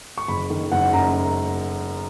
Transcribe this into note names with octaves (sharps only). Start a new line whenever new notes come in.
C#6
F#1 B5
D#3
F#1 F#5
F#2 A#5